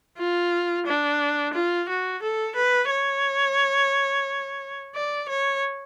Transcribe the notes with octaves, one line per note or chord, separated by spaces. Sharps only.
F4
D4
F4
F#4
A4
B4
C#5
D5
C#5